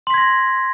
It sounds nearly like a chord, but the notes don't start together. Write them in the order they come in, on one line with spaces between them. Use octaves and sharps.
C6 B6 G#6 A#6